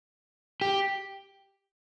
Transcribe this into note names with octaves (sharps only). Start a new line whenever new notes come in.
G4